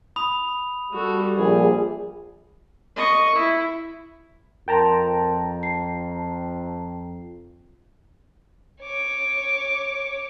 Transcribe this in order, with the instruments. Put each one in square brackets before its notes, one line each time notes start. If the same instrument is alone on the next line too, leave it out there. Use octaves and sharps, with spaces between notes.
[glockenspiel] B5 D#6 F7
[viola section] G3 [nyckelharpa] F#4 A4
[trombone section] A#1 [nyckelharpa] G#4
[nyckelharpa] D#5 C#6
E4
[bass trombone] F2 [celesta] A#4 C6 [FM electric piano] G5 A5 A#5
[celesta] C7
[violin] C#5 D6